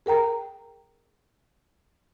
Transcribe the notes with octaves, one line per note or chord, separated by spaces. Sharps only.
G#4 A#4 G5 A#5